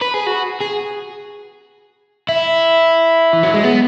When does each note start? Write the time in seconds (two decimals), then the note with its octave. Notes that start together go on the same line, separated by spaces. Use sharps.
0.01 B4
0.14 G#4
0.27 F#4
0.60 G#4
2.29 E4
3.33 E3
3.43 F#3
3.54 G#3
3.64 B3